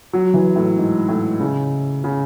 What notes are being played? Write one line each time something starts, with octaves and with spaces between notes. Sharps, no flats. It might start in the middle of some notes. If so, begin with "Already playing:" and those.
F#3
E3
A2
G#2
A2
C#3
C#3